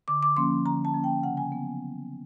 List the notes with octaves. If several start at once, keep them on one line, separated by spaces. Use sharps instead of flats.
D3 D6
D6
F3 A#3 C#4 C6
D3 A#5
A5
F3 A#3 C#4
G5
C#3 F#5
G#5
F#3 B3